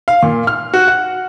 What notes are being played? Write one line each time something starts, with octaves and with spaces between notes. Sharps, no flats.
F5
A#2
F6
F#4
F#5